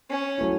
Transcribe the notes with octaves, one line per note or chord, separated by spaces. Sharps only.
C#4
F#3 A3 E4